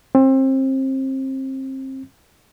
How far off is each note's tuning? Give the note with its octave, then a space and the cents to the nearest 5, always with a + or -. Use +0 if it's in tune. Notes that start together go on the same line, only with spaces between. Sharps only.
C4 +30